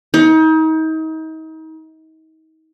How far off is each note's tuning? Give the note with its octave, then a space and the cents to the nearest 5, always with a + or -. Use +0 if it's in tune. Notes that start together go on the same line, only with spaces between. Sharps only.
D#4 +35